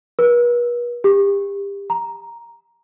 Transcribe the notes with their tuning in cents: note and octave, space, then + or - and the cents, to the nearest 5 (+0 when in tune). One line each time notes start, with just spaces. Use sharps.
B4 -40
G4 +30
A#5 +5